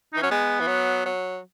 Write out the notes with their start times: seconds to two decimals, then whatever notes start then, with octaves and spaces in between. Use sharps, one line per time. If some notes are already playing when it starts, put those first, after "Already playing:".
0.13 E3 D#4
0.22 F#3 C#4
0.31 G#3 B3
0.61 E3
0.67 F#3
1.05 F#3